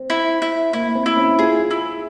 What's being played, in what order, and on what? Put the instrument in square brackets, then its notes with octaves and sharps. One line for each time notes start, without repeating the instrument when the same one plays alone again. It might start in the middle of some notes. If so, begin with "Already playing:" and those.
Already playing: [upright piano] C4
[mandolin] E4
E4
[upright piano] A#3 [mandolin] E4
[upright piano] C4
[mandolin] E4
[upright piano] C#4
[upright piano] F4 [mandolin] G#4
[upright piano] F4
[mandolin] E4